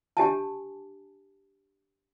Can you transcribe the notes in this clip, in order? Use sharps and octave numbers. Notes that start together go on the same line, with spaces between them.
D4 G4 G#5 A5